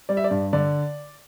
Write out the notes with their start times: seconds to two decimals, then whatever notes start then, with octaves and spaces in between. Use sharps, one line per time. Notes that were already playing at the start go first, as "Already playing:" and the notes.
0.09 G3 D5
0.17 E5
0.24 D5
0.31 G2
0.53 D3 D5